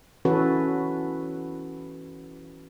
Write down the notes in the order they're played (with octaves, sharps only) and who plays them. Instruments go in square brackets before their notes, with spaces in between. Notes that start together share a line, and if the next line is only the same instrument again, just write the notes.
[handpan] E3 C#4 F#4 A4 B4